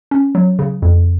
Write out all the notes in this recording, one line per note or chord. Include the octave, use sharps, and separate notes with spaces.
C#4
F#3
C#3
F2